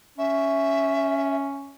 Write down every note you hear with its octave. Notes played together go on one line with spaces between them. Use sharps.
C#4 E5